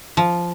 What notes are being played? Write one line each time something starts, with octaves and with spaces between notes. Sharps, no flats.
F3